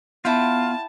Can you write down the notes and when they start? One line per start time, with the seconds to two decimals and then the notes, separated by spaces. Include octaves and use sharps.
0.25 B3 E4 F4 F#5 G5 A5